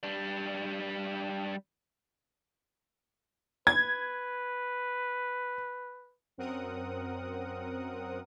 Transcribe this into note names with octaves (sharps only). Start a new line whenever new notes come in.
G3 D4
B4 G#6
F#2 C4 A#4 F#5 D#6